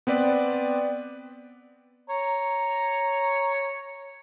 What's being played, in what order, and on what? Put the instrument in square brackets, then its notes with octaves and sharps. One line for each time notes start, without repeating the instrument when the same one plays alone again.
[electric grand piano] B3 C4 B4 D5
[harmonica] C#5 A#5